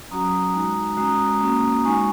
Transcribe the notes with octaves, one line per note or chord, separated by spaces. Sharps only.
F#3 C#4 F#4 A#5 D#6
G#3 D#4 F#4
G#3 C#4 F#4 A#5 D#6
A#3 C#4 F#4
G#3 D#4 F#4 G#5 C#6